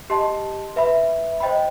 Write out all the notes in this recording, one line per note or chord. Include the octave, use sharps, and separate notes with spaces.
G4 D#5 A5 C6
B4 E5 B5
C5 D#5 G5 B5